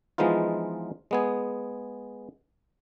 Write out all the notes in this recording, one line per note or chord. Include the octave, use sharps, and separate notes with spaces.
E3 F3 G#3 B3 D#4 F4
G#3 B3 G#4